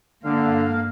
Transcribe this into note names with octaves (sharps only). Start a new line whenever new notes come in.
G2 D3 A#3 F5